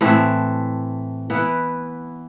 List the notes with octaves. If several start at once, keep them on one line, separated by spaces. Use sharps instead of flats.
A2 E3 A3 C4
E3 B3 E4 B4